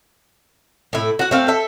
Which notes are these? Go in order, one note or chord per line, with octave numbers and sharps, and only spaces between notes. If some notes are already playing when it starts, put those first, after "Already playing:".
A2 E4
F#4 F#5
A3 C4 F5
A4 E5